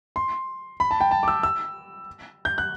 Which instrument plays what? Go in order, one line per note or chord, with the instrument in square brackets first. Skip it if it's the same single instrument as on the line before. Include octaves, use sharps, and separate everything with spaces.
[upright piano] C6
B5
A5
G5
A5
D6
E6
E6
G6
F#6